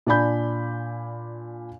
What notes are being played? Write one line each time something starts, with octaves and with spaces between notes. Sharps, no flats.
A#2 D4 D5 G#5 B5 G6